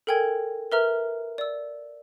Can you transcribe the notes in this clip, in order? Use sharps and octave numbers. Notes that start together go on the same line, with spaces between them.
A4 A#4 G5 G#5 G#6
A#4 B4 E5 A#5 F6
D5 E6